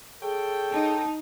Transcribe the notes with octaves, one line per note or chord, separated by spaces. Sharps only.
G#4 A4 C#5 G5
D#4 A5